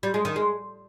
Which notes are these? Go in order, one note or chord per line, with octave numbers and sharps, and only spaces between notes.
G3
G#3
D#3
G#3